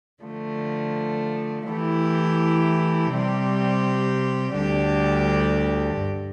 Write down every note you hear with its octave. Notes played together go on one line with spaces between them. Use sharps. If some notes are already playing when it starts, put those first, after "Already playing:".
D3 F3 A3
E3 A3 E4 G4
C3 G3 C4 G4
D2 D3 G3 D4 G4
G2